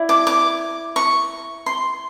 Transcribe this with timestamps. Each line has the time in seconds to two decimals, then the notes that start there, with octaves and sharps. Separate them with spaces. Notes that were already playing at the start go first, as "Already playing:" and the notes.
Already playing: E4 D5
0.09 D6
0.27 D6
0.96 C#6
1.66 C6